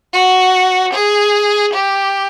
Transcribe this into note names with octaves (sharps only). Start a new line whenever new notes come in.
F#4
G#4
G4